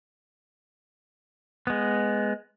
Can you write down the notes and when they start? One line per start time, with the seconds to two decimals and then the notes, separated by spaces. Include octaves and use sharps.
1.67 G#3 B3